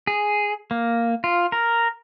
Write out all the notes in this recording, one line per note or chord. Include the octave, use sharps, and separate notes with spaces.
G#4
A#3
F4
A#4